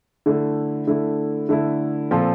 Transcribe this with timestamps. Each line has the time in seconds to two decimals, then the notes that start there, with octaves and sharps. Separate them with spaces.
0.26 D3 A3 E4
0.87 D3 A3 E4
1.49 D3 A3 E4
2.11 A#2 F3 C4 F4 A4